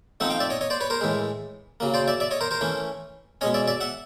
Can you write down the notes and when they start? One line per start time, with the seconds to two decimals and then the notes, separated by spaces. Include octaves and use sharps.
0.20 F3 A3 C4 D#4 E5 F#5
0.30 F5 G5
0.40 D5 E5
0.50 C#5 D#5
0.61 C#5 D#5
0.70 C5 D5
0.81 B4 C#5
0.90 A#4 C5
1.01 A2 E3 G#3
1.80 C#3 F#3 A#3
1.94 C5 D5
2.08 D5 E5
2.20 D5 E5
2.31 C#5 D#5
2.41 A#4 C5
2.51 A#4 C5
2.61 E3 A3 C#4
3.41 B2 G#3 C#4 C#5 D#5
3.54 D5 E5
3.68 D5 E5
3.81 E5 F#5